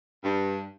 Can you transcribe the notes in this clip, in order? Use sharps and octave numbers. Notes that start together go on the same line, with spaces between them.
G2